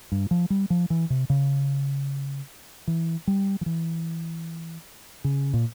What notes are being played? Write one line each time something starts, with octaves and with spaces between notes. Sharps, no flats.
G2
F3
G3
F3
E3
C3
C#3
E3
G3
F3
E3
C#3
A#2